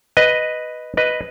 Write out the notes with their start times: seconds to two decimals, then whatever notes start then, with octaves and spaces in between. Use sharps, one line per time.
0.17 B4 D#5
0.97 B4 D#5